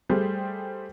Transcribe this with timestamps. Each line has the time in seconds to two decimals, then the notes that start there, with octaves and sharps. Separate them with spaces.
0.09 G3 A3 G4 G#4 C5